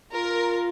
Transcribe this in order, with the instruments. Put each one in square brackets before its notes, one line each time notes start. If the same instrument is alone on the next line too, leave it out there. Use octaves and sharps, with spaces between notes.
[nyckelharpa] F4 [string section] A#4